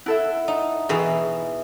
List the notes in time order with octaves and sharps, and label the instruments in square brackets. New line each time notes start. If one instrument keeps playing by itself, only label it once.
[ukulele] E4 A4 [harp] E5 F#5
[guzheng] D#4
[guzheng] B2 E3 [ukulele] G#4